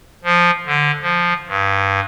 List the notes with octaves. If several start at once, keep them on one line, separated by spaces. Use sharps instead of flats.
F3
D3
F3
G2